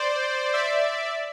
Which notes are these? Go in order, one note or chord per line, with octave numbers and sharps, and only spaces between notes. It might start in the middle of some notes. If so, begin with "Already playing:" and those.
Already playing: C5 D5
D5 E5